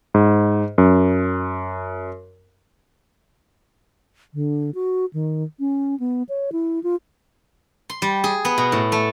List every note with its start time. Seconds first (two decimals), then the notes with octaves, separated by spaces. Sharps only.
0.14 G#2
0.78 F#2
4.34 D3
4.75 F#4
5.14 D#3
5.60 C#4
6.00 B3
6.29 C#5
6.52 E4
6.83 F4
7.90 C6
8.02 G3
8.24 G#4
8.45 B3
8.58 B2
8.72 A2
8.92 A3